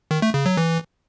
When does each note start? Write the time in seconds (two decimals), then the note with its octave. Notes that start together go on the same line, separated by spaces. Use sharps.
0.11 D#3
0.22 A3
0.34 C#3
0.46 F#3
0.57 E3